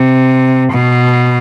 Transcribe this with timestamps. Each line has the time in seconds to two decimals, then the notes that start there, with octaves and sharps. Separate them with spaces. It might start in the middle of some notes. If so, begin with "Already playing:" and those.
Already playing: C3
0.72 B2